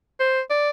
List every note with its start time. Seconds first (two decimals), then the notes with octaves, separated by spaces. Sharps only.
0.20 C5
0.50 D5